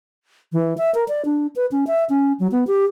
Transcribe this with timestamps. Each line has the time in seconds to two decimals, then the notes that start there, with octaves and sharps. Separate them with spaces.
0.53 E3
0.78 E5
0.95 A#4
1.08 D5
1.25 D4
1.56 B4
1.72 C#4
1.87 E5
2.10 C#4
2.40 F#3
2.52 B3
2.67 G4